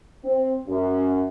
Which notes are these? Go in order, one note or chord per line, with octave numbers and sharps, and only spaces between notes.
C4
F#2